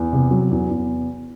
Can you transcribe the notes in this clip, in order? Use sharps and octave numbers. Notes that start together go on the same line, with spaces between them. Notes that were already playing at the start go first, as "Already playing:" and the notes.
Already playing: E2
C3
F#3
E2
E2